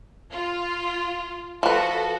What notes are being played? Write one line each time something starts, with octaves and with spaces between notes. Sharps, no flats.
F4
F3 F#4 A4 B4